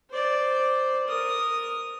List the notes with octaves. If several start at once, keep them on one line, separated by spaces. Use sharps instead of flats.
C5 D5
A#4 D#6